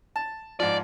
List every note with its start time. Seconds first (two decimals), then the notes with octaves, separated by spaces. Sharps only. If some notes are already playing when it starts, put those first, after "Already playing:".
0.16 A5
0.60 G#2 F3 D5